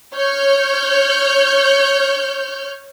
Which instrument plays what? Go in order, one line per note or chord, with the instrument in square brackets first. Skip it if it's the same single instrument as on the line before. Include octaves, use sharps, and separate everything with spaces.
[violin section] C#5 F6 G6